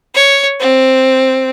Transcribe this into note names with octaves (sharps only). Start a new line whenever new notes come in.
C#5
C4